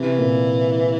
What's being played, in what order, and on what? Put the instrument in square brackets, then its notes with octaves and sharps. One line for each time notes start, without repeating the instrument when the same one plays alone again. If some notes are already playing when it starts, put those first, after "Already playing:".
Already playing: [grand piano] C3 [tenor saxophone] E3
[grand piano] A#2